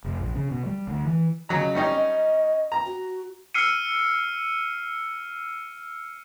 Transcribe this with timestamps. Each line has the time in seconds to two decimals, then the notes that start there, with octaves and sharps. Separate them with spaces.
0.04 F1
0.19 A#1
0.35 C#3
0.51 B2
0.66 G3
0.87 D2
1.05 E3
1.49 C#3 F#3 D#5 A#5
1.75 G3 C#4 D#4
1.94 D#5
2.72 A#5
2.85 F#4
3.54 E6 F6 C7 C#7 D#7